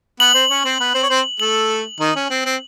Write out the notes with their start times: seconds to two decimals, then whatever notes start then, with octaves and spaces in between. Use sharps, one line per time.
0.20 B3 B4 F#7
0.34 C4 C5
0.50 C#4 C#5
0.65 C4 C5
0.80 B3 B4
0.94 C4 C5
1.03 C#5
1.10 C4 C5
1.40 A3 A4 F#7
2.00 D#3 D#4
2.15 C#4
2.30 C4
2.45 C4